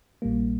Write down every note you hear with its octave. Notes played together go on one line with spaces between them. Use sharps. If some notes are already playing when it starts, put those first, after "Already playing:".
A#1 A#2 G3 A#3